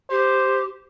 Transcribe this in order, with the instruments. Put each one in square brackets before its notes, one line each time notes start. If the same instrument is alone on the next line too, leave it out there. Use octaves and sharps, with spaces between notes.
[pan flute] G4 [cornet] C5